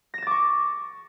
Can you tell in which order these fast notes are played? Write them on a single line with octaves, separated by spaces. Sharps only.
A#6 E7 A6 D6 C#6